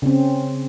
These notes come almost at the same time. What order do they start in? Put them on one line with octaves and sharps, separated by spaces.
C#3 C4 C#4